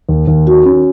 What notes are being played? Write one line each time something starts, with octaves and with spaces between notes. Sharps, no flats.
D#2
D#2
D#3 F#4
C#4